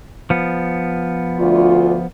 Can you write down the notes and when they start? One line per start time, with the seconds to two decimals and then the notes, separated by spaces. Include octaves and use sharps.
0.30 F3 B3
1.38 D2 F4